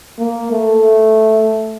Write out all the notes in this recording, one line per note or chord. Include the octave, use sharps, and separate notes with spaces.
A#3
A3